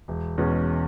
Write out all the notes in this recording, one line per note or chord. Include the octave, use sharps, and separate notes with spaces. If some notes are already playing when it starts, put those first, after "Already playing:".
E1
E2 B2 G#3 C#4